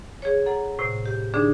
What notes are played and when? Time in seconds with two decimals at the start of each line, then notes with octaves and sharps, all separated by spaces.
0.22 G#4 C#5
0.46 A4 F#5 A#5
0.79 A2 C3
1.06 G4
1.34 D3 D4 D#4 G#4